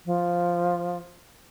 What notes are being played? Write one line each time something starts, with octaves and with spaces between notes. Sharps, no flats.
F3